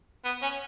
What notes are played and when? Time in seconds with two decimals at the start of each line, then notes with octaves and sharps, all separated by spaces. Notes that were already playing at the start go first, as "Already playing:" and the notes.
0.25 B3
0.43 C#4